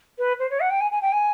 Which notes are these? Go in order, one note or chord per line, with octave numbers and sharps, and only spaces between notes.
B4
C5
C#5
F#5
G5
G#5
G#5
G5
G#5